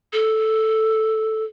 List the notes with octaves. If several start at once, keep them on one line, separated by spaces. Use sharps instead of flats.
A4